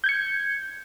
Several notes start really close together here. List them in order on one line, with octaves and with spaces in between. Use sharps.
G6 G#6 C#7